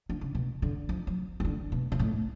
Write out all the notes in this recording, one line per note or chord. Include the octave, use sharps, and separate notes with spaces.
D3
C#3
B2
D3
F3
F#3
F3
D3
B2
B2
A2